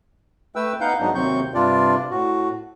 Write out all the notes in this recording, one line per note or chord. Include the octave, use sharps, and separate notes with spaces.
A3 B4 G5 E6
B3 D#4 B4 F5 F#5 G6
G#2 F#3 B3 D4 D#4
D#2 C3 F#3 C4 C#6 G6
G2 C3 D4 F4 D5
A2 F#4